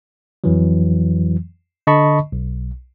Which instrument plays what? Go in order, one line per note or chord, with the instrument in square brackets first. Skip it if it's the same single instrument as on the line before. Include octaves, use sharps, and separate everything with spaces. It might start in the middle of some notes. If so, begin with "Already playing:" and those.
[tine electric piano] F2 E3 F#3
D3 D#5 A5 B5 C#6
B1